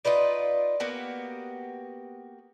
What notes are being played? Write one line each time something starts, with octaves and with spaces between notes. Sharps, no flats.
D#4 F4 B4 D5
A#3 B3 F#4 G4